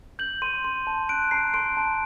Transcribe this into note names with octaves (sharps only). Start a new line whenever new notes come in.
G6 F#7
C6 D#7
C6
A5
F#6 D7
A#5 C7
C6 D7
A5